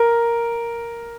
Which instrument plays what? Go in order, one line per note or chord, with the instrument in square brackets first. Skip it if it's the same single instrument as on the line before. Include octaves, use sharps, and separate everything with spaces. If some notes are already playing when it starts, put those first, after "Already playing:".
Already playing: [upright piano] A#4